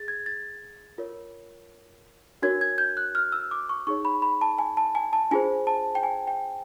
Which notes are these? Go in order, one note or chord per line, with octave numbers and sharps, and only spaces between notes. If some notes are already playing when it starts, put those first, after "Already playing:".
Already playing: G#4 A6
G#6
A6
F4 A#4 C#5
D4 F#4 A#4 C#5 G#6
G#6
G6
F#6
F6
E6
D6
C#6
D#4 G#4 C#5 C#6
B5
B5
A5
G#5
A5
G#5
A5
D4 F4 G#4 C5 G#5
A5
G5
G#5
G5